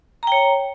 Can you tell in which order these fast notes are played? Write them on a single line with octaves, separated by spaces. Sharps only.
A#5 G5 C#5